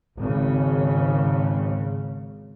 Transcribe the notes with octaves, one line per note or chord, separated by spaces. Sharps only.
G#1 C#3